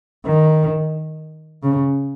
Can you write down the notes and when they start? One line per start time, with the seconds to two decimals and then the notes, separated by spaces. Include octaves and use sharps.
0.25 D#3
1.63 C#3